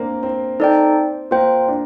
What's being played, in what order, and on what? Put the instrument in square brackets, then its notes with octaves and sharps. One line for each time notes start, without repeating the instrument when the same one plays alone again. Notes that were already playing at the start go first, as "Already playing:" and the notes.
Already playing: [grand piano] A#3 C4 D4
C4
[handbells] D#4 A4 D5 G5
[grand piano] A#3 [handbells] F4 C5 G5
[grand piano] D4